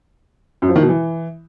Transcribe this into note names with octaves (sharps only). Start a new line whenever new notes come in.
F#2
F3
D#3
B2
E3